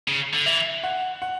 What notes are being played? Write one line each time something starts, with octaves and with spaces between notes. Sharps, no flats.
C#3
D3
E3 E5
F#5
F#5